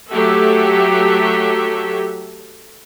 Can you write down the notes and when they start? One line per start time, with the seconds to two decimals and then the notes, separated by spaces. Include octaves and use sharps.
0.10 F#3 A3 G4 A4 E5